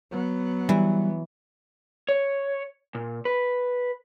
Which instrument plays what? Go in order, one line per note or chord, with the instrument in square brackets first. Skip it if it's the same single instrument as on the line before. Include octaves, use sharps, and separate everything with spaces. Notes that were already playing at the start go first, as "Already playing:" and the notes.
[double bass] F#3 B3
[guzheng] E3 [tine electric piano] G3
[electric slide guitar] C#5
A#2
B4